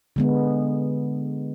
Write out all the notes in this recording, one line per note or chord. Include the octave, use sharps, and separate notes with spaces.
D3 G#3 B3